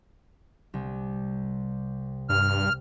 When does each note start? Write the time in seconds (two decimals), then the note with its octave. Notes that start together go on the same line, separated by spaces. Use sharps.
0.74 C2
2.29 G2 F6